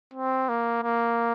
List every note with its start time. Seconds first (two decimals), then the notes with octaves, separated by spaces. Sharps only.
0.14 C4
0.49 A#3
0.83 A#3